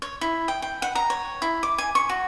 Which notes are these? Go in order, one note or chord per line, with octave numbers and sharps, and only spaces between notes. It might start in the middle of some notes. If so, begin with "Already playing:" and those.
C#5
E4
G5
G5
F#5
A#5
C#5
E4
D6
G#5
C#6
F#4